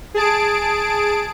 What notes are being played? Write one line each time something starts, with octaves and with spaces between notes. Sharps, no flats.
G#4 A5 D7